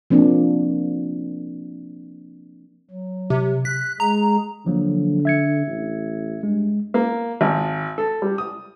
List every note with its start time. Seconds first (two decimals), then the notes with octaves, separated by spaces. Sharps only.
0.10 F3 A#3 C4 D4
2.91 F#3
3.30 C3
3.65 F#6 B6
4.00 G#3 G#4 A#5
4.66 D3 F3 F#3 A#3
5.25 E5 G#6 C#7
5.67 A1
6.43 G2 G#3
6.94 A#3
7.41 G#1
7.98 A4
8.22 G3
8.38 D#6